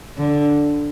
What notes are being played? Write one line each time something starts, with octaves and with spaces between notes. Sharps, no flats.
D3